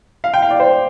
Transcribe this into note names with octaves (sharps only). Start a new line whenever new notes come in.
F5
G5
F5
D5
C5